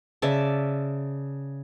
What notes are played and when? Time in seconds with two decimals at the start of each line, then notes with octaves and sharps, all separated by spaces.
0.22 C#3 D5 E5 A5